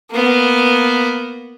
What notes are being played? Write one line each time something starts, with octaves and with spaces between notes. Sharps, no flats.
A#3 B3